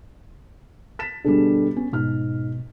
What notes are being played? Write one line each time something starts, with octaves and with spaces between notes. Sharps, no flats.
A6 B6 E7
B2 D3 G3 D4 G#4 A4
B3 C#4
G#2 B2 F6